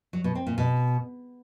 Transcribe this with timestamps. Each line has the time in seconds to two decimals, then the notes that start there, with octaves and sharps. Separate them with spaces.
0.13 F#3
0.24 B2
0.35 C4
0.47 A#2
0.58 B2